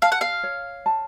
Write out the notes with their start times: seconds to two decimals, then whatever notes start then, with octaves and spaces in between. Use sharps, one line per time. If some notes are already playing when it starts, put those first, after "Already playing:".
0.02 F5 A5
0.12 F#5
0.21 F5
0.43 C#5
0.86 A5